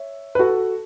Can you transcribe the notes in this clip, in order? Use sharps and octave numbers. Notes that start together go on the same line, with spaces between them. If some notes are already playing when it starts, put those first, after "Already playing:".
Already playing: C#5 E5
B4
F#4 A4